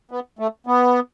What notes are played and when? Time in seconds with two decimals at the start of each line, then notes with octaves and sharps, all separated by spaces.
0.11 B3
0.39 A3
0.67 B3